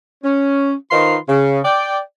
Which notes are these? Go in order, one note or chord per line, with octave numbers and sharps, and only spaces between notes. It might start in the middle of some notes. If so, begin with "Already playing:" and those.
C#4
D#3 D#4 F4 B4 C5 C6
C#3
D5 G5